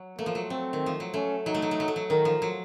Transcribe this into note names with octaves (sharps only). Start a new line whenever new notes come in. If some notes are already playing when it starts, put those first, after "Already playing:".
Already playing: F#3
A3 A#3
F3
F#3
A3 C4
D#3
F3
F#3
A3 C#4
F#3 D#4
A3
F#3
A3
F#3
A3
F#3
D#3 A#4
F3
F#3